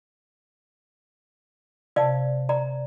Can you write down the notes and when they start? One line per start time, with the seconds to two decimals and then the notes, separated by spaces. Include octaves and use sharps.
1.96 C3 D5 F5 A5
2.49 D5 A#5